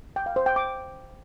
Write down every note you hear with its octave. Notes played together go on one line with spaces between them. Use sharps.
G5
F5
C5
G5
D6